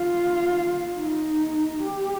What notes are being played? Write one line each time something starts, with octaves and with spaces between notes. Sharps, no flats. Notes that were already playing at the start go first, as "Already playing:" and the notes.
Already playing: F4
D#4
G4